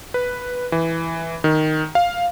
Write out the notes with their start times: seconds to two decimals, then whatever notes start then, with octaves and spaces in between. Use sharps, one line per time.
0.14 B4
0.72 E3
1.44 D#3
1.95 F5